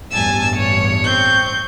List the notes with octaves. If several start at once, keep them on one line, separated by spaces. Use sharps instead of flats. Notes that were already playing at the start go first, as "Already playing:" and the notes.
A1 E2 G2 G#5 A5 E6
C#5
C4 C#6 G6